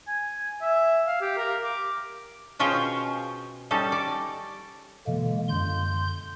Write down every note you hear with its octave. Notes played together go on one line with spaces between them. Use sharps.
G#5
E5
F5
G4
A#4
D6
B2 C#4 F4 G#4 C5 G5
G3 C#4 D#4 A4
D5
B2 D3 E3 G#3 A#3
F#2 D3 C6 G6